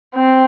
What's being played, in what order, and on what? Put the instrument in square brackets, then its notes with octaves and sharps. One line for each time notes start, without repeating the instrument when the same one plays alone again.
[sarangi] C4